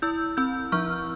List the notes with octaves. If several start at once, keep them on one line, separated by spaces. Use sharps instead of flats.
E4 E6 G6
C4 E6 G6
F3 C#6 F6